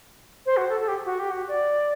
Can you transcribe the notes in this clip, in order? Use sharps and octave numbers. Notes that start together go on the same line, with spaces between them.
C5
F#4
A4
A4
G4
F#4
G4
F#4
D5